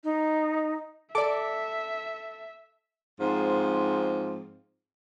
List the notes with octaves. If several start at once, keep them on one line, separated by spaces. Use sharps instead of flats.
D#4
A4 D5 E5 D6
G#2 F3 C4